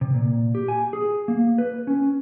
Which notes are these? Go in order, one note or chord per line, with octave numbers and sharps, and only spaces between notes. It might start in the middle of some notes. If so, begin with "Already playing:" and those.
C3
A#2
G4
G#5
G#4
A#3
B4
C#4